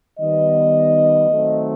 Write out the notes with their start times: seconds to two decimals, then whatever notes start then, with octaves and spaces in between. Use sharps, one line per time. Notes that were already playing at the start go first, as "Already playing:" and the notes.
0.19 D#3 G3 B3 D#5
1.29 D#3 F#3 A3 C4